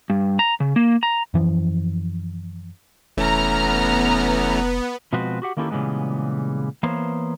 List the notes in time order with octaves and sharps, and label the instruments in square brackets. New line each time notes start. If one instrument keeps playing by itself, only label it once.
[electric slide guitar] G2
A#5
C#3
A#3
A#5
[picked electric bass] F#2 E3 F3
[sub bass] F1 [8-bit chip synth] E3 A3 C#4 [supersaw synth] B3 [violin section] A#5 F6
[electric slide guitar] B2 F3 G#3 C4 F#4 B4
F#4 G4 F#5
D#3 A#3 C#4 E4 G4 A4
A#2 C#3 E3 G3 G#3 B3
E3 A#3 B3 C5 C#5